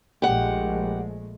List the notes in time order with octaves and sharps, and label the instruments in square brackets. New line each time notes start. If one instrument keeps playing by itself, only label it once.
[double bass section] A#1 G#3 A3 [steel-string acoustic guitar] G4 F#5